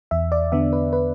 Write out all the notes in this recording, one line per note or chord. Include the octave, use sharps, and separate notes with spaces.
E2 E5
D5
D3 B3 D4 E5
B4
B4